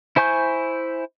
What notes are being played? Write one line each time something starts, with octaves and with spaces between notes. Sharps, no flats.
E4 C5 G#5 C#6 G6